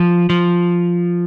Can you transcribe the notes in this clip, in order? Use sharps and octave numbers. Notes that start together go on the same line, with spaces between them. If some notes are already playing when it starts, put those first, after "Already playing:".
Already playing: F3
F3